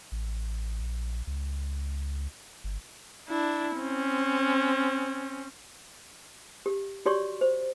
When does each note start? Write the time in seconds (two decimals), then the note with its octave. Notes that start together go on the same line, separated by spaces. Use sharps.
0.12 A1
0.80 A#1
1.27 C#2
2.64 G1
3.29 D4 E4
3.77 C4 C#4
6.66 G4
7.06 F#4 G4 C#5 D5 C6 C#6
7.41 C5